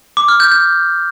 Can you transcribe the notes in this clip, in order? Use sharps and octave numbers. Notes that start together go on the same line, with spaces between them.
D6
F6
G6
G6